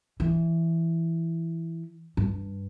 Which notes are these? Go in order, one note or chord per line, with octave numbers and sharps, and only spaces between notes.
E3
G2